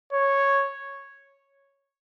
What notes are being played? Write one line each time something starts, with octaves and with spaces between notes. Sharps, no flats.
C#5